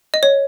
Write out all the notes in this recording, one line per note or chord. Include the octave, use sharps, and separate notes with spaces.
D#5
C#5